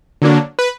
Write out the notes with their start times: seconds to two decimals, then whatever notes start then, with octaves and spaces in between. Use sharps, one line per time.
0.22 D3 F#3 A#3 D4
0.59 B4